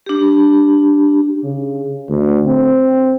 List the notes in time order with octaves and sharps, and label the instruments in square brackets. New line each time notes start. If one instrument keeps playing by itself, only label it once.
[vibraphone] D4 G4
[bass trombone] C#3
D2
C4